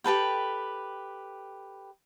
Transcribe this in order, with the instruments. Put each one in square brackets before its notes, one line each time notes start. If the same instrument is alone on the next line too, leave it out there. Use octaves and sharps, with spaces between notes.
[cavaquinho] G4 A4 B4 G5